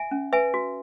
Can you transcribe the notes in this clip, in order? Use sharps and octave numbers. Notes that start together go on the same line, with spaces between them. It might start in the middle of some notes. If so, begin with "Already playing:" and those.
Already playing: E5 G#5
C#4
B4 E5 G#5
F#4